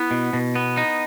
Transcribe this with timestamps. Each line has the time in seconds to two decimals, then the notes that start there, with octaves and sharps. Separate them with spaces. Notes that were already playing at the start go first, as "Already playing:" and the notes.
Already playing: B3 E4
0.11 B2
0.33 B2
0.55 B3
0.77 D#4